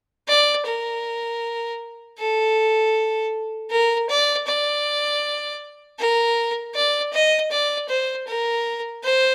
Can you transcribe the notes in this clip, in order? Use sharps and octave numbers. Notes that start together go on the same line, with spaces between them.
D5
A#4
A4
A#4
D5
D5
A#4
D5
D#5
D5
C5
A#4
C5